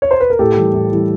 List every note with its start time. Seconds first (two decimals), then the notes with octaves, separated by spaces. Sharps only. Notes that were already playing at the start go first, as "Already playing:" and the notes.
0.02 C#5
0.11 C5
0.20 B4
0.30 A#4
0.39 A2 G4 A4
0.57 E3 G3
0.74 A2
0.91 E3 G3